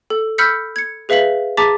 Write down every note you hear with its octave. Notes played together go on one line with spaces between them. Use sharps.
A4
B5 E6 F6 G6 B6 C#7
G#6 C#7
G#4 B4 E5 F5 B6 F#7
G#4 A5 A#5 D6 A6 B6